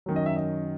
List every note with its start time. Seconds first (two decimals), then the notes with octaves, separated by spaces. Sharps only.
0.06 F#2 D#3 F#3
0.16 D#5
0.26 E5
0.36 D#5